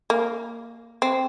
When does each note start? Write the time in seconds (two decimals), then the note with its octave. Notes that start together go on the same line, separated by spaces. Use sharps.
0.10 A#3
1.02 C4